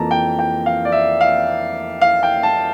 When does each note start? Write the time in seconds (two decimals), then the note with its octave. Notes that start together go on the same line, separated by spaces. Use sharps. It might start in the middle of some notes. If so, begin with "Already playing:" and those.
Already playing: F2 E3 A#3 A5 A#5
0.11 G5
0.39 G5
0.66 F5
0.85 D5
0.92 E5
1.21 F5
2.02 F5
2.23 G5
2.43 A5